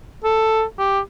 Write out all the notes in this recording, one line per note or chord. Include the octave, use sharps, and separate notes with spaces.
A4
G4